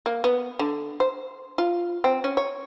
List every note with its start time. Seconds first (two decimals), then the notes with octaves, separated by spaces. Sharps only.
0.06 A#3
0.24 B3
0.59 D3
1.00 C5
1.58 F4
2.04 C4
2.24 C#4
2.37 C#5